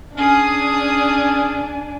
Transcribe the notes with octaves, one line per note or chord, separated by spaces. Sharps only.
C#4 D4 G#4 G#5 D#6